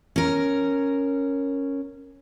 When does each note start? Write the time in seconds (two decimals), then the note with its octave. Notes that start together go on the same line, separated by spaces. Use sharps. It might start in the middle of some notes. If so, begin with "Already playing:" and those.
0.16 C#4 A#4